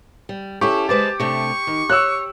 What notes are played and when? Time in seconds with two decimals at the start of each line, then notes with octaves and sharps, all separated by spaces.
0.29 G3
0.61 C#4 E4 G4 A4 C#6
0.89 G#3 B4 C5 A5 D6
1.20 C3 A3 D4 C#6
1.67 D#3
1.90 C#5 E6 F#6